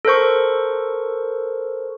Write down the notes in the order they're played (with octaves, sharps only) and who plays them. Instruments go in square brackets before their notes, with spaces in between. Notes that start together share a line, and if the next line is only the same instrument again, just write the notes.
[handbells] A4 A#4 C5 C#6